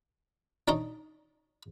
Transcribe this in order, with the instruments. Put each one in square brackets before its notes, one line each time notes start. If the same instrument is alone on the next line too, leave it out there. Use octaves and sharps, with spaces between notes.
[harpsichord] D4 D#4 C#5 D#5 A#5